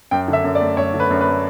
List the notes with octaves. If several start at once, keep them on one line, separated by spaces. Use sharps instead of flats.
F#2 G5
D3
E5
F#2
D5
A3
F#2 C#5
D3
B4
F#2
B4
A3